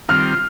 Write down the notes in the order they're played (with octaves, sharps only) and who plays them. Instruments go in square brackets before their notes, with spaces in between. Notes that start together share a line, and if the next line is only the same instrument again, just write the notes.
[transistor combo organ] D#3 G3 C4 F4 [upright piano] F6